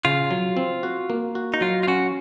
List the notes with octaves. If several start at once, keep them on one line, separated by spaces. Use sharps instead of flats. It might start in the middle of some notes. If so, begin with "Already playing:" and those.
C#3 F4
F#3
C4
F#4
A#3
F#4
D#4
F#3 F4
F4
C#4 F#4